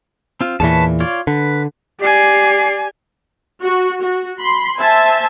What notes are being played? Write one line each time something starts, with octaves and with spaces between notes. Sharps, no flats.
C4 F4
E2 A#2 E3 B4 C#5 A5
F4 C#5 D5
D3 B4
G4 D5 G#5 C7
F#4
F#4
B5 C6
C5 E5 G#5 A5